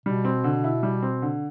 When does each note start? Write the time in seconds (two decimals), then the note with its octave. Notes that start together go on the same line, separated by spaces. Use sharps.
0.06 B2 G3
0.25 C4
0.44 D3
0.64 E4
0.83 G3
1.02 C4
1.22 D3